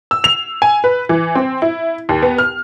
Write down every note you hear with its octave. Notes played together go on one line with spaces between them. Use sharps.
E6
F7
G#5
B4
E3
C4
E4
D#2
B3
F6